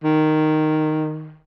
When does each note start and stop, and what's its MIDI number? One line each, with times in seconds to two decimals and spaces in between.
0.04 1.37 51